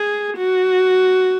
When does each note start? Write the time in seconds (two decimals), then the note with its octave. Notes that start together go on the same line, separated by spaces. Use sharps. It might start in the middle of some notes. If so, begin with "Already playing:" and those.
Already playing: G#4
0.37 F#4